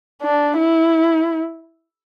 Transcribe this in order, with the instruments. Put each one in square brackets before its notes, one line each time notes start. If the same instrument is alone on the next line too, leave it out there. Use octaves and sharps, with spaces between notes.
[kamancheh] D4
E4